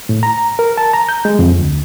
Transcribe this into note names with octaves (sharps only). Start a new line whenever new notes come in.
A2
A#5
A#4
A5
A#5
G6
G#3
F2
D2